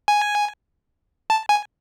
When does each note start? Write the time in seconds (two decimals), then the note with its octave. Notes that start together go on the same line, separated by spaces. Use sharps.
0.08 G#5
1.30 A5
1.49 G#5